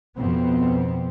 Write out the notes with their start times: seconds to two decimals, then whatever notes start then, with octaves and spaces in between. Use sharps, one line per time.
0.16 F2 B2 B3 C4